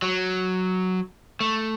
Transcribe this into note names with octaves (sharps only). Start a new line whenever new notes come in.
F#3
A3